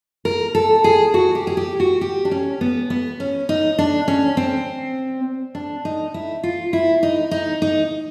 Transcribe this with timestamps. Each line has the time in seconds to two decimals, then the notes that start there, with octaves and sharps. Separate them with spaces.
0.25 A#4
0.55 A4
0.84 G#4
1.14 F#4
1.35 G4
1.47 G#4
1.57 G4
1.80 F#4
2.01 G4
2.25 D4
2.31 C#4
2.61 B3
2.90 B3
3.20 C#4
3.49 D#4
3.78 D4
4.08 C#4
4.37 C4
5.55 D4
5.85 D#4
6.14 E4
6.43 F4
6.73 E4
7.03 D#4
7.31 D#4
7.62 D#4